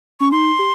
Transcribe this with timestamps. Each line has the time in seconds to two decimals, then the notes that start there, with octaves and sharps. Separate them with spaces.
0.20 C#4 C#6
0.31 D#4 C6
0.59 G4